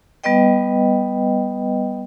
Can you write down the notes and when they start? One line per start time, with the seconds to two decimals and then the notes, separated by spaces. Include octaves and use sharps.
0.24 G3 B3 B4 D#5 G5